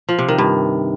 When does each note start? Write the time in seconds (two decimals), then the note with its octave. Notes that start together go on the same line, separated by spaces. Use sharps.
0.09 F3
0.19 C3
0.28 D#3
0.38 G2